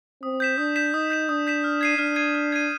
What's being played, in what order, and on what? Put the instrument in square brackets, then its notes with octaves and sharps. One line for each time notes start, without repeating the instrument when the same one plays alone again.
[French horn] C4 [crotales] D#6
[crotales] G6 B6 E7
[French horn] D4 [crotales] D#6
[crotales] G6 B6 E7
[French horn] D#4 [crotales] D#6
[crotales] G6 B6 E7
[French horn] D4 [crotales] D#6
[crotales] G6 B6 E7
F6
G#6 C7 D#7
[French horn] D4 [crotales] F6
[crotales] G#6 C7 D#7
F6
G#6 C7 D#7